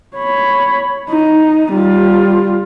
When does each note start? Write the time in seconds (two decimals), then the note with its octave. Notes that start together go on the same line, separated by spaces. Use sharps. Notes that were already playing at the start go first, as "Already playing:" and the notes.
0.16 C#5 B5
1.09 D#4
1.74 G3 F4